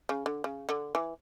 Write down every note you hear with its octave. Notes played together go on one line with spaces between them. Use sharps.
C#3
D3
C#3
D3
E3